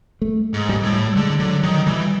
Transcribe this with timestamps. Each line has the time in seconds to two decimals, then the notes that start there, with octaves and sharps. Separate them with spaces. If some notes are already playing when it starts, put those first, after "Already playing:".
0.22 A3
0.53 G#2
0.69 G3
0.84 A2
0.92 G3
1.16 D3 G#3
1.40 D3 F#3
1.63 D#3 F#3
1.86 E3 G3